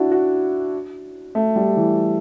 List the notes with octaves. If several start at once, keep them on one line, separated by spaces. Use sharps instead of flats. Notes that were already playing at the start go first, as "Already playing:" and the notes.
Already playing: D4 E4 F#4
F#4
A3
G3
E3